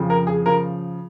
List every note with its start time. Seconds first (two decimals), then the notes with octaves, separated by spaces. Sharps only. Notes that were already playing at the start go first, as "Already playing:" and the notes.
Already playing: F2 C#3 F3
0.10 A#4
0.27 G#4
0.46 C#3 F3 A#4